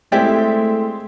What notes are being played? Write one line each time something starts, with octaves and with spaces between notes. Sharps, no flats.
G#3 A3 C4 E4 G4 D5 E5